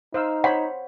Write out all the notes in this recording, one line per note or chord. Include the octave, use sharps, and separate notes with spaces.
D#4 C5 F5 E6
C5 C#5 F#5 B5